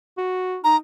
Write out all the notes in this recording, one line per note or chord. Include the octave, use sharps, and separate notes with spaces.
F#4
D#4 A#5